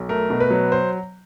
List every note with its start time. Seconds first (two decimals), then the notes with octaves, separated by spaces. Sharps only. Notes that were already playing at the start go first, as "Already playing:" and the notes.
Already playing: B1
0.09 A3 A#4
0.30 B2
0.40 B4
0.50 F#3
0.72 C5